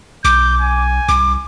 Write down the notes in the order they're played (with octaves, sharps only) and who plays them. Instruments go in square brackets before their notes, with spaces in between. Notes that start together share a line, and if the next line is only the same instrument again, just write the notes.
[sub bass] B1 [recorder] D6 [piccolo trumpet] G6
[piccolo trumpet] G#5
[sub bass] C2 [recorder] D6